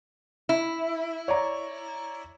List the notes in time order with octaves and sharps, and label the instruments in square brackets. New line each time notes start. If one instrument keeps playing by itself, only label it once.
[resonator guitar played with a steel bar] E4
[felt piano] C#5 D5 A#5